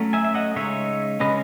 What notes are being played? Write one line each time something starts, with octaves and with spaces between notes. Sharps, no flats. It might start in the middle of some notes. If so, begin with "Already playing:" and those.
Already playing: F#3 A3 C#4
E5 G#5
E5
D#5 F#5
C#3 G#3 D#4 C#5 E5
C#3 G#3 C#4 B4 D#5